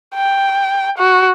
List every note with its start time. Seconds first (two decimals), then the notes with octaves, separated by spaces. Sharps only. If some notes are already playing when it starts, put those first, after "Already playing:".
0.15 G5
0.98 F#4